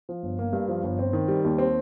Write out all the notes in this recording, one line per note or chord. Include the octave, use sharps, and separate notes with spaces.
F3
G1
A#3
G2
F3
G1
C4
D#3
G3
D#2
C4